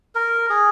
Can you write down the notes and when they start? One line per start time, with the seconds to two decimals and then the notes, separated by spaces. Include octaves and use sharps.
0.15 A#4
0.50 G#4